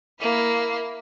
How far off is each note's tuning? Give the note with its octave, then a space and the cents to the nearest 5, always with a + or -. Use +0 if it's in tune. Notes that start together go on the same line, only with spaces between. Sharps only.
A#3 +0 E4 +0